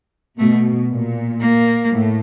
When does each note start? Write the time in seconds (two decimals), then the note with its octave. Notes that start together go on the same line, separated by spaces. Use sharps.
0.38 B2 A3
0.90 A#2
1.41 A#3
1.92 A2